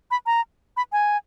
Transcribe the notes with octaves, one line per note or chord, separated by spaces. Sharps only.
B5
A#5
B5
G#5